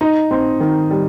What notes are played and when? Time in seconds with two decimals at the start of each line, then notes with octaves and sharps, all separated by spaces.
0.01 D#4
0.31 C4
0.60 D#3
0.91 G3